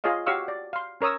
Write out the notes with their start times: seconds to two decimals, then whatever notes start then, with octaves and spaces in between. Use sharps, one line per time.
0.04 F4 G#4 C#5 D#5 F5
0.26 F#4 G4 C#5 F5 C#6 E6
0.48 D5
0.73 F5 C6
1.01 C#4 A#4 C#5 D#6 E6